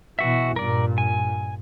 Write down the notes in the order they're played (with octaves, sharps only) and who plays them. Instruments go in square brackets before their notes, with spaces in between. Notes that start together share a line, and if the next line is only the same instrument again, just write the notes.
[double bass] B2 E3 [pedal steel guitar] F#4 E5
[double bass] G2 A#2 [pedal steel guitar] A#4 D5
[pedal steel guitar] G#5